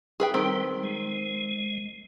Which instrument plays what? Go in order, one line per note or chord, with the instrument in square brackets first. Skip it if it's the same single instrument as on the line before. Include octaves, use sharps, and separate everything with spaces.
[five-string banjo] G#4 B4 G5
[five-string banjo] D#3 C4 [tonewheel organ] G3
[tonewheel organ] G#3